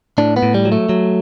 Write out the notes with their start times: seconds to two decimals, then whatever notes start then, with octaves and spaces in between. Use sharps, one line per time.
0.18 A2 D4
0.36 B3
0.43 A2
0.54 G3
0.65 F#3
0.72 A3
0.89 F#3